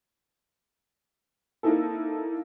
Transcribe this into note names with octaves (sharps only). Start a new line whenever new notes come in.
A#3 C4 D#4 E4 A4